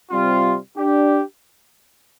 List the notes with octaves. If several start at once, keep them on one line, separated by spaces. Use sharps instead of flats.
C3 G3 C4 F4
D4 G4